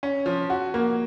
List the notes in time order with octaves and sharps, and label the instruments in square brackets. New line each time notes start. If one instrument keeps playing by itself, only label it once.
[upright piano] C#4
F3
F#4
A#3